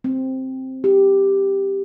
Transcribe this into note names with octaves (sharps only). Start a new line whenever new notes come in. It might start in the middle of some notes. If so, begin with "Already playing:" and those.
C4
G4